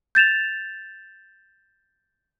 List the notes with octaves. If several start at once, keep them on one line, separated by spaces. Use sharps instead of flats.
G6 A6 E7 F7